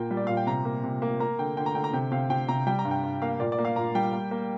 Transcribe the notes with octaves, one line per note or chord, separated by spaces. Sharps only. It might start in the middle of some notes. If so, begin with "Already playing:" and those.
Already playing: A#2 A#3 G5
G3
D5
A#2 F5
G5
C3 A#5
A#3
C3
A#3
A#3 A#5
D3 G5
D3 G5
A#5
D3 G5
A#5
C3 G5
C3 F5
C3 G5
C3 A#5
G3 G5
A#5
G2
G5
G2
A#3 F5
A#2 D5
D5
A#3
F5
A#2 A#5
G3 G5
A#3
A#3